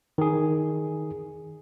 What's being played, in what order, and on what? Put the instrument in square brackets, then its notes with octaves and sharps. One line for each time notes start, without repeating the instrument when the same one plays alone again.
[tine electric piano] D#3 G#4